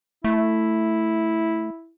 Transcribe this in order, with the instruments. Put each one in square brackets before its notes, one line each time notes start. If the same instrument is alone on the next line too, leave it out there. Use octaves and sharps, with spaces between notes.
[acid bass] A3 [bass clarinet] E4